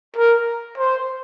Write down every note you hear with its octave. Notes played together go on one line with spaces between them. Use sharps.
A#4
C5